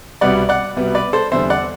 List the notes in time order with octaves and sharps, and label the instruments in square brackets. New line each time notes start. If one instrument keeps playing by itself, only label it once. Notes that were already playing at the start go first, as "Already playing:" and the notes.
[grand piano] C2 B2 G3 B3 [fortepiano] D5 F#5
[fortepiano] D5 F#5
[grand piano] C2 B2 G3 B3
[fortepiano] B4 D5
A4 C5
[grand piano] E2 D3 G3 C4 [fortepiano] C5 E5
[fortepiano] D5 F#5